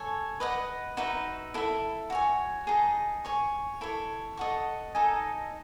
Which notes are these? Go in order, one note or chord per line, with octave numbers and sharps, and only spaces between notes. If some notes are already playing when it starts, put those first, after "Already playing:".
Already playing: A4 C#5 G#5
B4 D#5 F#5
D#4 F#4 B4 E5
E4 A4 E5
F#4 C#5 G#5
D#4 G#4 D#5 A5
C#5 G#5 C#6
E4 A4 C#5
A4 D#5 F#5 C#6
D#4 A4 D#5 G#5